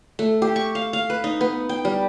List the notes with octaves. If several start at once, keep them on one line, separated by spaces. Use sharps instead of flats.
A3
G4
C#6
F5
F5
B4
D#4
B3
G5
G3